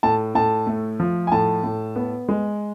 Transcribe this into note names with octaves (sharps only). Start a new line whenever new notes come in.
A2 A5
A2 A5
A3
F3
G#5
A2 A5
A2
B3
G#3